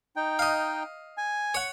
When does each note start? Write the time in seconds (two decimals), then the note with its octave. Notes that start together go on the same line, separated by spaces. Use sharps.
0.16 D#4 G5
0.39 D#5 F5
1.17 G#5
1.54 C#5 F#5